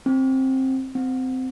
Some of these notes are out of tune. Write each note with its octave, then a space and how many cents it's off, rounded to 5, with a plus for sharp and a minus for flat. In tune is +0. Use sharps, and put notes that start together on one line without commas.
C4 +15
C4 -20